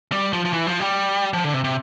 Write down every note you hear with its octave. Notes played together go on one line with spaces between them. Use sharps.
G3
F3
F3
E3
F3
G3
F3
D3
C3
C3